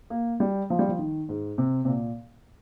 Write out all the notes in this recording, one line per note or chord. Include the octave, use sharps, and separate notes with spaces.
A#3
G3
F3
G3
F3
D#3
G#2
C3
C3
A#2